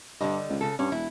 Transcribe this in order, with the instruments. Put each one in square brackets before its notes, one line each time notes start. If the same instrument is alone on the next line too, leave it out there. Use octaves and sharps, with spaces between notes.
[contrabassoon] G2 [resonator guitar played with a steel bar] D3 G3 D#5
[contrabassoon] C#2
[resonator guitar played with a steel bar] C#3 A4
[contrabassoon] G2 [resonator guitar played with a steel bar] C#4
[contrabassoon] E1 [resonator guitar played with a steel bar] E4